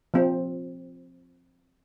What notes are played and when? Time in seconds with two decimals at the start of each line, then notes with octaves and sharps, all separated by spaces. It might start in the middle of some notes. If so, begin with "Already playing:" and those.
0.14 F3 C4